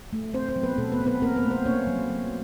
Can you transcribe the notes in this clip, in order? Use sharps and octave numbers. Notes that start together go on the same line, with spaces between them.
A3
A3 C4 C5
C4 C5
F#3
B3 B4
B2 A3 A4
B3 B4
C4
B3 B4
A#3 C4 A#4
B3 B4
A3
C4 C5
A#3 C#4 C#5
F#3
F#3